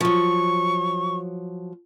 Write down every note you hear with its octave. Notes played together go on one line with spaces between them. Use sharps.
F3 F#3 C#6